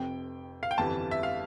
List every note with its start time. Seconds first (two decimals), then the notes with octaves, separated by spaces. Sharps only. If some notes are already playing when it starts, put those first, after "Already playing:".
Already playing: F1 F2 C3 G5
0.63 F5
0.71 G5
0.78 G1 F2 E3 G3 A5
1.11 E5
1.23 F5